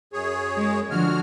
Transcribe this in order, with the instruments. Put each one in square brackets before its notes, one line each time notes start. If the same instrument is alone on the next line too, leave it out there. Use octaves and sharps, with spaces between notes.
[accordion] F#2 G#4 C#5
[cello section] G#3
[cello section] D3 F3 [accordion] F#4 F6